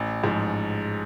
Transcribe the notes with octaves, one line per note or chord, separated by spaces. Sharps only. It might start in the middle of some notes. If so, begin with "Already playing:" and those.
Already playing: A1
G#2 F3